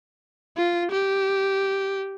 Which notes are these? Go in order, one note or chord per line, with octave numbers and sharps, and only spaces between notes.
F4
G4